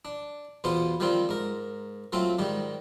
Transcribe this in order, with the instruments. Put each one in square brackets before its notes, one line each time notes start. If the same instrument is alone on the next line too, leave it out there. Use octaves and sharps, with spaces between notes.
[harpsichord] D4
E2 B2 B3 F4 C5
D#3 F3 G3 C4 F4
G#2 A#4
F#3 A3 C4 F4
G#2 D#3 G3